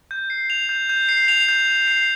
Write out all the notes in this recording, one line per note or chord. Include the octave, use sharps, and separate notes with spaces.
G6
C7
F7
G6
G6
C7
F7
G6
G6
C7